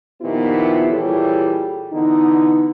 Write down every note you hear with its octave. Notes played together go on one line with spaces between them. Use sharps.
A#2 D#3 F3 B3 E4 G4
A#2 E3 G3 G#4 A4 C#5
D3 E3 B3 D#4